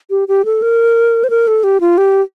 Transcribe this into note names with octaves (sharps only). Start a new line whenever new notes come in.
G4
G4
A4
A#4
C5
A#4
A4
G4
F4
G4